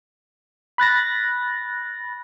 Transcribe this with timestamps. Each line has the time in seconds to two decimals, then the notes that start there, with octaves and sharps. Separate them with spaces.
0.78 B5 F#6 A6 A#6